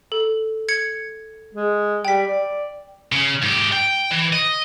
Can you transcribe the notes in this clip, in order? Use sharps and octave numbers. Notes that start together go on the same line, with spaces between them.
A4
G#6 C#7
G#3
G3 G5 B6
D5
C#3
G#2 G4
G5
E3
D#5